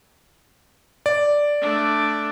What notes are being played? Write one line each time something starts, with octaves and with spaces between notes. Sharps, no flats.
D5
A3 D4